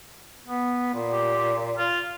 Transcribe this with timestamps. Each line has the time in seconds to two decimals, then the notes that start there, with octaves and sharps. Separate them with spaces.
0.46 B3
0.95 A#2
1.12 G4
1.78 F4